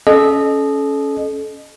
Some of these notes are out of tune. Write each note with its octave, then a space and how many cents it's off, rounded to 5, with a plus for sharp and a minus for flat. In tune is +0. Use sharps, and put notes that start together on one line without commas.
C#4 +0 A4 -35 D#5 -25